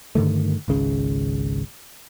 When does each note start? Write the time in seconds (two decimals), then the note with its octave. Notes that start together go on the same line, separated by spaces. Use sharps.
0.15 G2 D3 D#3 A3
0.68 G#1 C#2 C#3